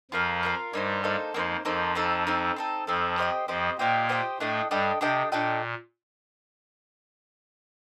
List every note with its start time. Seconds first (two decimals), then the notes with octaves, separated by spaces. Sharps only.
0.11 F2 F3 F4 A#4 F5
0.43 F4 A#4 F5
0.73 G2 G3 A#3 D#4 A4 C5
1.04 A#3 D#4 A4 C5
1.34 F2 F3 A#3 D#4 A4 C5
1.65 F2 F3 A#3 D#4 A4 C5
1.95 C4 D#4 A4
2.27 C4 D#4 A4
2.56 C4 D#4 A4
2.87 F2 F3 C4 D#4 A4
3.18 G4 C5 D#5 G5
3.48 F2 F3 G4 C5 D#5 G5
3.78 A#2 A#3 G4 C5 D#5 G5
4.09 G4 C5 D#5 G5
4.40 A2 A3 D4 A4 D#5 G5
4.70 G2 G3 D4 A4 D#5 G5
5.01 C3 D4 A4 D#5 G5
5.32 A#2 D4 A4 D#5 G5